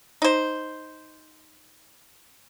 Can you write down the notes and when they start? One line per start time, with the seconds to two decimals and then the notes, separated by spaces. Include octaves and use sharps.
0.22 D#4 C5